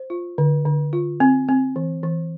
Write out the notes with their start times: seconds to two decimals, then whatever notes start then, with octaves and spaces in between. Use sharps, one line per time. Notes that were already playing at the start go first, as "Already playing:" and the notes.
Already playing: C5
0.10 F4
0.38 D3
0.65 D3
0.93 F4
1.20 C4
1.48 C4
1.76 E3
2.03 E3